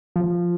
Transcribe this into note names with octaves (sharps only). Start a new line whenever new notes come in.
F3